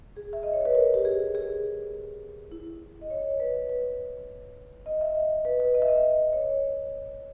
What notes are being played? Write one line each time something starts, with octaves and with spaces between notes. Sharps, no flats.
G#4
E5
D#5
C#5
B4
A#4
G4
G#4
G#4
E4
D#5
C#5
B4
B4
D#5
E5
D#5
B4
B4
D#5
E5
D#5
C#5